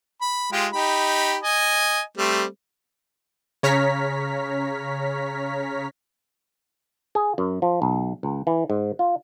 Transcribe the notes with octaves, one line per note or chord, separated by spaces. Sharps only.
B5
G#3 F4 G4
D#4 G4 B5
D#5 G#5
G3 A3 C4
C#3 C#5 A#5 F6 B6
G#4
F#2
F3
B1
C#2
E3
G#2
F4